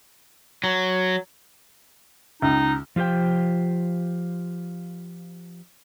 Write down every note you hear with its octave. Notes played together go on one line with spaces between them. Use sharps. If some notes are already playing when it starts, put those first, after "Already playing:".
F#3
C#2 D#4
F3 F4 G4 C5 G5